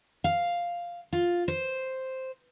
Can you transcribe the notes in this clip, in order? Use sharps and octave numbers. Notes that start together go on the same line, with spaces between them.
F5
F4
C5